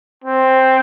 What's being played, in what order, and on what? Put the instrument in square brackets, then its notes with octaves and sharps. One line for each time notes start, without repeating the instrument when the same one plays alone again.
[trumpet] C4